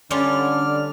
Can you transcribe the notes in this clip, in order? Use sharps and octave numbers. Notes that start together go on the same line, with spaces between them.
D3 G3 C#4 F4 D5 F6